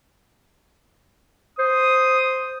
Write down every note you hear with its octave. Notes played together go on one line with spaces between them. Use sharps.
C5 D#6